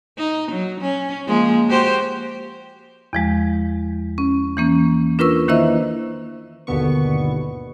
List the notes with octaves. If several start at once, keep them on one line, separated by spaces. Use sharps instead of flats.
D#4
F#3
C#4
F3 G#3 A#3
F#4 G4 C5
E2 F3 G#3
C#4
E3 A#3 C#4
D4 F4 A#4 B4 C#6 E6
D#3 A#3 E4 C5 D#5 E5
G1 D#2 B2 D3 B3 C#6